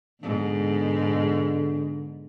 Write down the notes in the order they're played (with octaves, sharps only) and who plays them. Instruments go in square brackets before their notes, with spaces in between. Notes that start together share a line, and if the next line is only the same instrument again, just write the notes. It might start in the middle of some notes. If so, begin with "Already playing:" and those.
[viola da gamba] G#2 B2 [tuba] D3